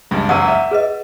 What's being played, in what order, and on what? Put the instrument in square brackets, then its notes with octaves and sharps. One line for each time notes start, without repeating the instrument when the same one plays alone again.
[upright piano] C#2 G2
[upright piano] F#1 C#2 D#7 [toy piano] F#5 E6
[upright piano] E5
[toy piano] G#4 B4 D#5